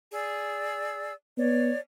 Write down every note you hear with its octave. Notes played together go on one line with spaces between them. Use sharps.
G#4 D5 E6
B3 C#5 D5